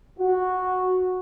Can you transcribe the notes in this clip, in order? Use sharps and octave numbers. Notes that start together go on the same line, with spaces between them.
F#4